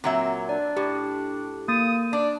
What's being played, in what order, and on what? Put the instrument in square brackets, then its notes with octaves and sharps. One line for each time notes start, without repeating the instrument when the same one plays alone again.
[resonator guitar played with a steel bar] A#2 F#3 E5 [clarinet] C4
[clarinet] D4 [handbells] D5
[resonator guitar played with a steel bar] A2 [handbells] G4
[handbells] A#3 A6 [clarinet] D#6
[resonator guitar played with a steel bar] D4 [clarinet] D5